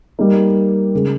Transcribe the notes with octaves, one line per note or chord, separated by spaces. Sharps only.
G3 A#3 D#4
C#3 G#3